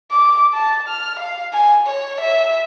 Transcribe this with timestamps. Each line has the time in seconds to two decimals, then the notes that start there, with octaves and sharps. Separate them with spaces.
0.11 D6
0.54 A5
0.89 F6
1.20 F5
1.53 G#5
1.87 C#5
2.21 E5